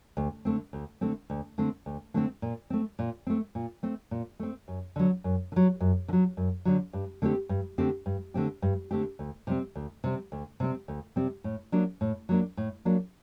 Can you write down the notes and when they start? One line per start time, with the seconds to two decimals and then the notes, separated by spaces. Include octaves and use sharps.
0.17 D2
0.45 D3 A3 C4
0.73 D2
1.01 D3 A3 C4
1.30 D2
1.58 D3 A3 C4
1.86 D2
2.14 D3 A3 C4
2.42 A#2
2.70 A3 C4
2.99 A#2
3.27 A3 C4
3.55 A#2
3.83 A3 C4
4.11 A#2
4.40 A3 C4
4.68 F#2
4.96 D3 F#3
5.24 F#2
5.52 D3
5.56 F#3
5.80 F#2
6.08 D3
6.13 F#3
6.37 F#2
6.65 D3 F#3
6.93 G2
7.22 D3 A3 C4 G4
7.49 G2
7.78 D3 A3 C4 G4
8.06 G2
8.34 D3 A3 C4 G4
8.62 G2
8.91 D3 A3 C4 G4
9.19 D2
9.47 C3 G3 C4
9.75 D2
10.04 C3 G3 C4
10.32 D2
10.60 C3 G3 C4
10.88 D2
11.16 C3 G3 C4
11.44 A2
11.72 F#3 A#3 D4
12.01 A2
12.29 F#3 A#3 D4
12.57 A2
12.85 F#3 A#3 D4